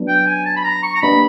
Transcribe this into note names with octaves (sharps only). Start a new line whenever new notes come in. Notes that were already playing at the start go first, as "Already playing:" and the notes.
Already playing: F#3 B3 D4
G5
G#5
A5
B5
A#5
C#6
A#5
A#3 D4 G4 B4 D#5 B5